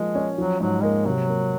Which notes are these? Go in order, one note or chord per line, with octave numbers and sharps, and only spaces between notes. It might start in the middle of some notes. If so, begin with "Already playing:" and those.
Already playing: F3 G#3 A#3
C#4
F3 F#3
G#2 F#3
G#3 A#3
C3 F#3
A#3